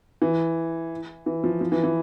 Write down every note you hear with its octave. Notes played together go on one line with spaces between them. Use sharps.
E3
E3
F3
F3
E3
E3